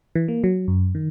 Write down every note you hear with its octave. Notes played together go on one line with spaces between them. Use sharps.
E3
A#3
F#3
F#2
D#3